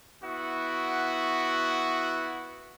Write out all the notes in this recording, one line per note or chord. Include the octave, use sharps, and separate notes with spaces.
B3 E4 F#4